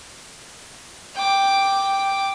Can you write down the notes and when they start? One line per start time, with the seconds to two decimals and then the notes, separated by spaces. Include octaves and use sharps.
1.15 G5 D6